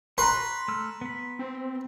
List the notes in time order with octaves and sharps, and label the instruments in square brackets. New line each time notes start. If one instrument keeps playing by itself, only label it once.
[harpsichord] B4 [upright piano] A#5 C6 [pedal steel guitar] C#6 F#6
[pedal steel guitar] A3 E6 F6
B3 B5
[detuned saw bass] C4